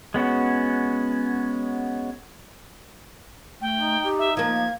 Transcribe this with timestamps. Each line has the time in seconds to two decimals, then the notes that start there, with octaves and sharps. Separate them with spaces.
0.14 G#3 B3 C#4 F#4
3.61 A3 G5
3.77 D#4
4.04 G4
4.19 E5
4.37 F3 A#3 F5 G#6